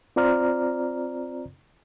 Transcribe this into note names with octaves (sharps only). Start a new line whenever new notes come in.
C4 F4 C5 D5 A#5 F6